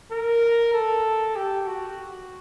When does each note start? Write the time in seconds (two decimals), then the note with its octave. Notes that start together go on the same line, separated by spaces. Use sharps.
0.12 A#4
0.73 A4
1.35 G4
1.67 F#4